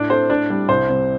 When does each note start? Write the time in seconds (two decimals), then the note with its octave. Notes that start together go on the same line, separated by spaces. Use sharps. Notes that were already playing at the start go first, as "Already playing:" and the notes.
Already playing: A2 D4 D5
0.10 A3 C4 C5
0.30 A2 D4 D5
0.50 G3 C4
0.69 C2 C5
0.89 C3 G3 C4